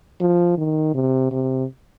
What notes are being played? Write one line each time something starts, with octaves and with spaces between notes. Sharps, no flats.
F3
D#3
C3
C3